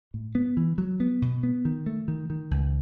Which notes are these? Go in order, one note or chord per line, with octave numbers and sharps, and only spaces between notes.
A2
B3
E3
F#3
B3
B2
B3
D#3
A3
D#3
D#3
C#2